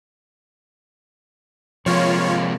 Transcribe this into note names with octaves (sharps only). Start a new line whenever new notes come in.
C3 F3 G#3 A#3 F4 C#5